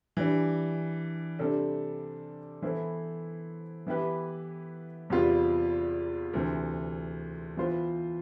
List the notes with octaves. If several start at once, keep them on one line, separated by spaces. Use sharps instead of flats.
E3 G3 D4
C3 G3 D4 A4
E3 B3 E4 A4 C5
E3 B3 E4 G4 B4
E2 C3 G3 B3 F4
D2 C3 E3
E3 B3 F4 C5